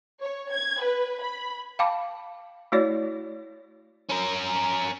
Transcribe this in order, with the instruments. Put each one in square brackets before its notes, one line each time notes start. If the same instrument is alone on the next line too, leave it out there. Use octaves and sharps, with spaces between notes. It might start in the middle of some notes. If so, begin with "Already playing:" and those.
[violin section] C#5
G#6
B4
B5
[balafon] F5 G5 A5 B5 D6
A3 E4 F#4 C#5 D5
[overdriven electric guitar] C#4 A#4